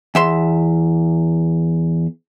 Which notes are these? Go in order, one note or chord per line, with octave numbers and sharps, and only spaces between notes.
E2 E5 C6